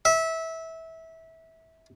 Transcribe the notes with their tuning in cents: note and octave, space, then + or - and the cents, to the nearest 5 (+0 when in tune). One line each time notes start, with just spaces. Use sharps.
E5 -20